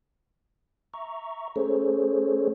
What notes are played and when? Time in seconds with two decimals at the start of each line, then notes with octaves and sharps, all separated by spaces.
0.94 E5 A#5 C#6
1.56 A3 C#4 G#4 A4 C5 C#5